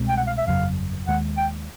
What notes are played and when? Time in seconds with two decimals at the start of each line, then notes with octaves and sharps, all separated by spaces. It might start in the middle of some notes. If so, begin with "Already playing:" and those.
Already playing: C2 B2 G#3 C4
0.08 G5
0.17 F#5
0.27 F5
0.38 E5
0.46 G1 F2 C#3 F#3 F5
1.07 D#2 D#3 G#3 F#5
1.37 G5